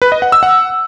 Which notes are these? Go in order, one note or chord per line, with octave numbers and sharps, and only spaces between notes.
B4
D#5
F#5
E6
F#5